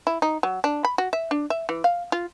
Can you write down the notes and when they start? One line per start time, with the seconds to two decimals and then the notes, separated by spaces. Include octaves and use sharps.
0.07 E4
0.22 D#4
0.43 F#3
0.64 D4
0.85 B5
0.98 F#4
1.13 E5
1.31 D4
1.50 E5
1.69 E3
1.84 F5
2.12 F4